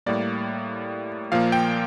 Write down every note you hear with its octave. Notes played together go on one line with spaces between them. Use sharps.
A2 G3 A#3 D5
A#2 F3 A#3 F5
G5